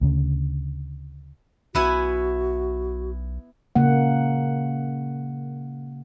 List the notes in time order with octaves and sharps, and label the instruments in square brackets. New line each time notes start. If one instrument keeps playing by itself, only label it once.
[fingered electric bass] D2 C#3
[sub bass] B1 [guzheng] B3 E4 G#5 [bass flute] F#4
[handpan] C#3 A#3 F#5